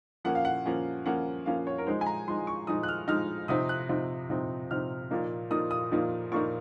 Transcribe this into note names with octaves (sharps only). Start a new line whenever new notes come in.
F3 A#3 C#4 F#5
F5
F#5
F3 A#3 C#4
F3 A#3 C#4 F#5
F3 A#3 C#4 F5
C#5
A#4
F3 G#3 D#4 C5
G#5
A#5
F3 G#3 D#4 C6
C#6
F3 G#3 D#4 D#6
F#6
F6
F3 G#3 D#4 F6
C3 F3 C4 D#4 D#6
F#6
C3 F3 C4 D#4
C3 F3 C4 D#4
C3 F3 C4 D#4 F6
A#2 F3 A#3 D#4
A#2 F3 A#3 D#4 D#6
D#6
A#2 F3 A#3 D#4
A#2 F3 A#3 D#4 C#6